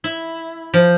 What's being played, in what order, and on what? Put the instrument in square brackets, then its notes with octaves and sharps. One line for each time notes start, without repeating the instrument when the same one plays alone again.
[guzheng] E4
F3